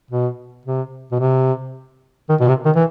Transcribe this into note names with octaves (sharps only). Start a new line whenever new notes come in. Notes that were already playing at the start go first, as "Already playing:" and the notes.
B2
C3
B2
C3
D#3
B2
C3
D#3
E3